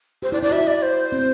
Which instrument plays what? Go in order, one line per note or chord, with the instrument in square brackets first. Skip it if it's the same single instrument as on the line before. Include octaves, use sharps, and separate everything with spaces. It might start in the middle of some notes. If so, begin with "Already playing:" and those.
[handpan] G4 [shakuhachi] C5
[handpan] E4 [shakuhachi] D5
[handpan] E4 [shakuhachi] D5
[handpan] F#4 [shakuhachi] E5
[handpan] E4
[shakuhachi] D5
C5
[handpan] C4